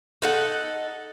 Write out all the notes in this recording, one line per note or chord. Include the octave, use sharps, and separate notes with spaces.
D#4 A4 F#5